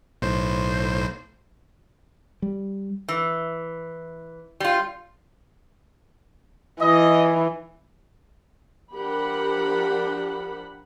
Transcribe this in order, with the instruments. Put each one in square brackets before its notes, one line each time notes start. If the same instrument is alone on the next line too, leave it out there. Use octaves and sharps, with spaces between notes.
[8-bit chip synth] B1 A2 C5
[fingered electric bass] G3
[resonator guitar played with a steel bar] E3
G3 F4
[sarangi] E3 [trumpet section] D#5
[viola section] F3 D4 G4 A#4 F#5 B5